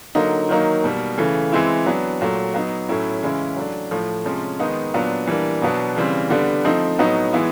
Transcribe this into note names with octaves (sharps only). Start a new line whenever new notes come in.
D3 F#3 A#3 D#4
D#3 F#3 A#3 D#4
B2 G3 A#3
C#3 E3 A3
E3 G#3 C4 E4
F#3 B3 D4
A#2 F#3 A3
F#3 B3 D#4
A2 F#3 A3 C#4 E4
C#3 E3 G#3 C#4 E4
F#3 A3 D4
A2 F3 A3
C3 F3 G#3 C#4
D#3 G#3 B3 D#4
A#2 F#3 B3 D4
E3 G3 A#3 D4
B2 F#3 B3 D4
C#3 E3 G3 C4
D3 G3 B3 D4
F3 A3 C4 D#4
A2 F#3 B3 D#4
E3 G#3 B3 E4